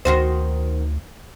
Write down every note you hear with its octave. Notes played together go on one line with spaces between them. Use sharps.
D2 D#3 F#4 C5